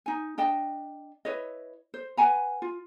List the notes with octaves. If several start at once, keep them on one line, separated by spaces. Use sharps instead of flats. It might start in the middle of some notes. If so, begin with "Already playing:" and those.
D#4 G#5
D4 D#5 G5 A5
E4 B4 C#5 D#5
C5
B4 F#5 G#5 A#5
F4